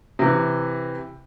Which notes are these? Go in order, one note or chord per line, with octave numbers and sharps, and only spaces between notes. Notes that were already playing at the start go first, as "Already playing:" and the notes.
C3 E3